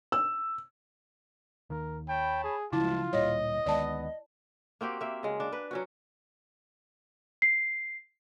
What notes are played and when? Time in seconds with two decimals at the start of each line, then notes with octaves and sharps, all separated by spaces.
0.12 E6
1.70 D#2 D#3 A#4
2.08 C#5 G5 A5 B5
2.44 G#4
2.73 D2 C#3 F3 F#3 G#3 E4 F4 A5
3.13 D1 A#2 G3 C#5 D#5
3.66 D2 D#3 G#3 B3 D5 A5
4.81 A#3 C4 F#4 G4
5.01 A#3 E5
5.23 C#3 G#3
5.40 D4
5.52 B4
5.71 F#3 C#4 F#4
7.42 C7